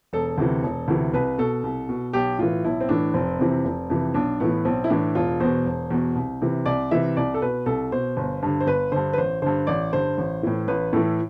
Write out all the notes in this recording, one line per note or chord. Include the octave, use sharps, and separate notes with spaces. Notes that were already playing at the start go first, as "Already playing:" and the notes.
E1 A4
D2 C3 E3
E1
D2 C3 E3
C2 B4
B2 A4
C2
B2
B1 G4
A2 E3 F4
B1 E4
C4
A2 E3 D4
F1 C4
F2 C3 E3
F1
F2 C3 E3
B1 D4
A2 E3 B3
B1 C4
E4
A2 E3 D4
E1 F4
E2 B2 C5
E1
E2 B2
C2
C3 E3
C2 D5
C3 E3 E5
C2 D5
A4
B2 B4
C2 A4
B2 C5
G1
G2 D3
C5
G1 B4
G2 D3 C5
B4
A1 C5
G2 D3 C5
A1 D5
G2 D3 C5
A1
A2 E3
A1 B4
A2 E3 A4